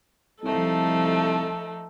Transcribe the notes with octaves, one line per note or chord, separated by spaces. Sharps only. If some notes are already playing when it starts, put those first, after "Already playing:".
C2 F3 A3 D#4 A4